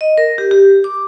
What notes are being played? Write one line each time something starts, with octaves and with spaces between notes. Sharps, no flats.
D#5
A#4
G4
G4
D6